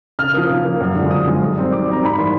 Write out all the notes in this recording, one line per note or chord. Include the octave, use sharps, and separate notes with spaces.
C#3 F6
F3 A#3 D#6
C#3
F3 A#3
F#2
D3 F3 G#3
F#2 D#6
D3 F3 G#3
F#2
D#3 G3 C4
F#2 D6
D#3 G3 C4 A#5
G#2 B5
E3 G3 A#3 C6